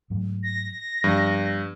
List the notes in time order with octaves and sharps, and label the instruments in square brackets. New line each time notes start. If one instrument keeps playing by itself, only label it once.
[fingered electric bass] G#2 F#3 A3
[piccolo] A#6
[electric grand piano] G2 [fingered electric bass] F3 A#3 B3